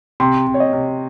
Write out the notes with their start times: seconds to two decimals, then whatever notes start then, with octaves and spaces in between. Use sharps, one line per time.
0.20 C3 C6
0.47 C3
0.54 C#5
0.60 D#5
0.73 C3